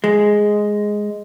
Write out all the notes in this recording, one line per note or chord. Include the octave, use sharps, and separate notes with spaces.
G#3